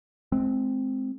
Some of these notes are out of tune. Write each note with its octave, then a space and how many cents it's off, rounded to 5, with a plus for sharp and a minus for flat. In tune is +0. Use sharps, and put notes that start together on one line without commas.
G#3 +40 C4 +0